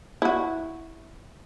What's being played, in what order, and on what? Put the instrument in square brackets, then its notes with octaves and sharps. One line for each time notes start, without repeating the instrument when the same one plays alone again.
[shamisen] E4 F#4